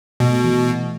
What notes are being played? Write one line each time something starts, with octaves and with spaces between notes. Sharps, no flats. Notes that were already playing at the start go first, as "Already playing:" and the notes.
B2 A3
E3